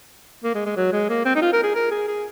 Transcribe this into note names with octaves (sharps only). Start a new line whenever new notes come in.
A#3
G#3
G#3
F#3
G#3
A#3
C4
D#4
F4
A#4
G#4
A#4
G#4
G#4